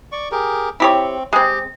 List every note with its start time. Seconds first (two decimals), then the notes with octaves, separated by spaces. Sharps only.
0.12 D5 C#6
0.31 G4 G#4 A#4
0.80 C4 E4 G4 C#5
1.33 G#3 C4 G4